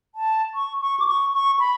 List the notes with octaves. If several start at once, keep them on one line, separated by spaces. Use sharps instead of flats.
A5
C#6
C#6
D6
C#6
C#6
B5